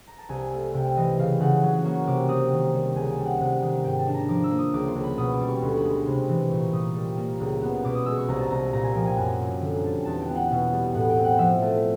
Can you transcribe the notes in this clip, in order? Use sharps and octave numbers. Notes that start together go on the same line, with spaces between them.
A#5
A5
C2 G#5
A3
C3 G5
E3 D#5
C#3 F5
C#3 F#5
F#3
A#3 C#6
C3 D6
C4 D#6
D#3
G3
C#2 G#5
G5
G3
F#5
C3
D#3
G#2 G5
A5
D4
A#5
F3 D6
E6
A#3
D#6
C#2 D6
C6
C#2
B5
B2 D#6
D6
G3
C#6
D2 C6
B5
G#3
B5
C3 C6
E3
A#2 C#6
A#2 D#6
G3
A#3
C#2
B3
B2 D6
D#6
G#3 E6
C#6
C2 A#5
A5
C2 A#5
A#2 A#5
G#5
F3 G5
G#5
F#2 A#5
C4
D3
G3 A5
E2 A5
G5
B3
F#5
B2
G3
A2 F#5
G5
C4
F#5
F3 E5
A3